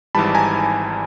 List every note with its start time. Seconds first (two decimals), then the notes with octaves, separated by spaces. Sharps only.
0.15 G#1 G#2 E3 G3 A5 B5
0.35 G#5 A#5